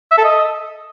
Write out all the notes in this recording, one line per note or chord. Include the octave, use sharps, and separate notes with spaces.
E5
A4
D#5